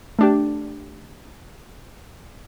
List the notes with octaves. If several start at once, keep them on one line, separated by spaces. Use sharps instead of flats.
A3 D4 G4